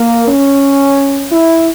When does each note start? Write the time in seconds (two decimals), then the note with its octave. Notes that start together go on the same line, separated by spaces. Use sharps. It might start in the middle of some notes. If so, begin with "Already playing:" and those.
Already playing: A#3
0.27 C#4
1.32 E4